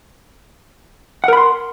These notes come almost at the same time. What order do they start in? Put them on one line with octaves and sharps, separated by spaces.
F#5 A#4 B5 C6